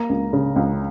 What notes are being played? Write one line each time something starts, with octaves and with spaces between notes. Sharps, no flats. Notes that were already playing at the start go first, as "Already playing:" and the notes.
Already playing: A#3 A#5
C#2
C#3
C#2